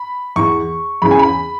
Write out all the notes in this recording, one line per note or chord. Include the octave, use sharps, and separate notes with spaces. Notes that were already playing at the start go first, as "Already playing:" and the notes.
Already playing: B5
E2 E3 C#6
E2 C#3 E3 B5
G#5
B5